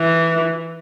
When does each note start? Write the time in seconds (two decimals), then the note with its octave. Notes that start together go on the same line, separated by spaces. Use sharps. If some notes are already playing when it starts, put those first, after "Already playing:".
Already playing: E3